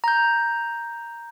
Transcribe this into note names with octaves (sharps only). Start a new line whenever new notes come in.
A#5 G6